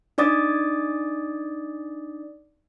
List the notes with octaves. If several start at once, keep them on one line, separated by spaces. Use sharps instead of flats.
D4 D#4 D5 D6 D#6 A6